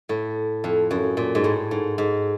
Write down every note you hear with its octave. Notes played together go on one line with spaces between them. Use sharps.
A2
F2
F#2
A#2
G#2
A2
G#2
G#2